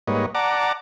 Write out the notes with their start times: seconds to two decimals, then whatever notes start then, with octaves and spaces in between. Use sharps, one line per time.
0.07 G#2 G3 A#3 B4 C#5 D#5
0.35 D5 F#5 A5 A#5 D6